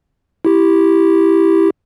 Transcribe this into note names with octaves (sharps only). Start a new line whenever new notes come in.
E4 G4